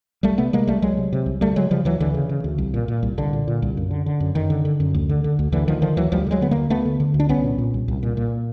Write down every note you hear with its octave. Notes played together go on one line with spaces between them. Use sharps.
C2 G3 A3
C3 A3 B3
C3 G#3 A#3
C2 G3 A3
C2 F#3 G#3
C3
C3
C2
D2 G3 A3
C#3 F#3 G#3
C#3 F3 G3
D2 E3 F#3
D2 D3 E3
C#3
C#3
D2
C2
A#2
A#2
C2
C2 D3
A#2
A#2
C2
F#2
D3
D3
F#2
F#2 D#3
D3
D3
F#2
D2
D3
D3
D2
D2 D3 E3
D3 D#3 F3
D3 D#3 F3
D2 E3 F#3
D2 F3 G3
D3
F#3 G#3
D3 B3
D2 G#3 A#3
D2 A3 B3
D3
D3
D2
D4
C2 B3 C#4
A#2
A#2
C2
C2
A#2
A#2